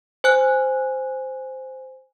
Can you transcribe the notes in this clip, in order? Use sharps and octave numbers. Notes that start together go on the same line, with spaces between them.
C5 G#5 F#6